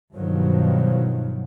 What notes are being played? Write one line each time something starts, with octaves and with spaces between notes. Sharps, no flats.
G2 B2 D#3 F3 F#3